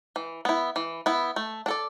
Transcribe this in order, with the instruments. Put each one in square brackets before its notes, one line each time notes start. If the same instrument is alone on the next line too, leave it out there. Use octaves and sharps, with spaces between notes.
[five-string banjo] E3
B3 E4
E3
B3 E4
A3
D4 A4 D5